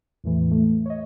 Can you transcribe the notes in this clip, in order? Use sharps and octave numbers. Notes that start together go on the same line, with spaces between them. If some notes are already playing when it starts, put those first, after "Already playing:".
E2 A2 E3
A3
C#5 D#5